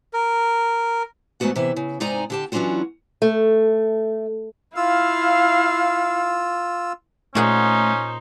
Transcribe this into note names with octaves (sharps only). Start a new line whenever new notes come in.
A#4
E2 G#2 A3 B3 F#4 F#5
C3 E3 E5
C#3
G#2 C3 D#4 D5 G#5 A#5
D3 G4 A5
E3 F#3 C#4 D4 F4 F#4
A3
E4 F4 F5 E6
A#2 A3 C#4 D#4 G#4 C5 F#5